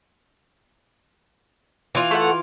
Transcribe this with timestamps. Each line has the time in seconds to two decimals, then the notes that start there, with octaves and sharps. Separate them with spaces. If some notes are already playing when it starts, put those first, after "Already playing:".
1.95 E3 F4
2.11 A3 F#5